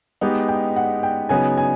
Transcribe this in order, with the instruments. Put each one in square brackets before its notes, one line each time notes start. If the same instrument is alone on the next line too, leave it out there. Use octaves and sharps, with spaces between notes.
[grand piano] G#3 B3 D#4 G4
[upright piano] G5
F#5
G5
[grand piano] C#3 F#3 B3 D#4 [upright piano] G#5
[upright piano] G#5